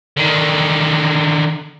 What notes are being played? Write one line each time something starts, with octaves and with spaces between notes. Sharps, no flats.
D3 D#3